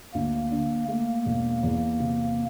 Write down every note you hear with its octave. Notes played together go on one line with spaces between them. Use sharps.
D2 A#3
D3
A3 A#3
E1
E2
C3